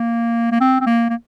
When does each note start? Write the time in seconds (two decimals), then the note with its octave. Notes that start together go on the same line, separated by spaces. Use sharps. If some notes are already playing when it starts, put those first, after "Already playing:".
Already playing: A#3
0.52 A#3
0.60 C4
0.81 C4
0.86 A#3
1.10 A#3